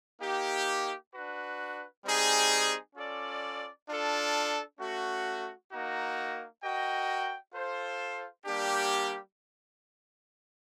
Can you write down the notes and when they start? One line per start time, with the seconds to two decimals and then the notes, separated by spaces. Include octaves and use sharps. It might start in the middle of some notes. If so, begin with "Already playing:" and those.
0.20 A#3 D#4 G4
1.13 D4 F#4 B4
2.04 G3 C4 D#4 G#4
2.96 C#4 F4 A4 D5
3.88 D4 F4 A4
4.79 A3 C#4 F#4
5.71 A#3 D#4 F#4
6.62 F#4 A#4 D#5 G5
7.54 F4 A4 C5
8.45 G3 A#3 D4 G4